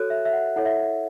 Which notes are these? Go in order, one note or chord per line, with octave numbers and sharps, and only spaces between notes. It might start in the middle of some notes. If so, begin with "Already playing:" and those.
Already playing: F#4 A4 C#5 F#6
E5
E5
F#5
E4 A4 C#5 F#5
E5
E5